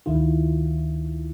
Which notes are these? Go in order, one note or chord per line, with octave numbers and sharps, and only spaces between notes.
D2 D#3 E4 F4